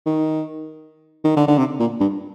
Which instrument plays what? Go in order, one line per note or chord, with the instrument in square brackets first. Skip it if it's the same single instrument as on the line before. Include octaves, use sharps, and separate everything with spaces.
[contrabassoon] D#3
D#3
D3
D3
C3
A#2
G2